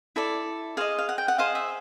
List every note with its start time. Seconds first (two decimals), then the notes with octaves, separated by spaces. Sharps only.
0.16 E4 A4 D5
0.77 G#4 C5 D#5 F5
0.98 F5
1.09 F#5
1.18 G5
1.28 F#5
1.38 G#4 C5 D#5 F5
1.55 E5